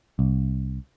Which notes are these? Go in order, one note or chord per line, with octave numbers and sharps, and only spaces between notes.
C2